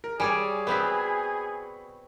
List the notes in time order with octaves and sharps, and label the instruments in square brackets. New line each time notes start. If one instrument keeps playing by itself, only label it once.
[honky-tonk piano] A#4
[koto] G3 C#5 D5 [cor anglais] G#4 [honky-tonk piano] G#5
[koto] B3 C4 F#4 [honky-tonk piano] B5 B6